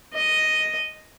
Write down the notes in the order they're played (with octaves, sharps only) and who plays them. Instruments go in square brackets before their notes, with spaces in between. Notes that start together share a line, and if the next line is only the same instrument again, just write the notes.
[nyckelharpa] D#5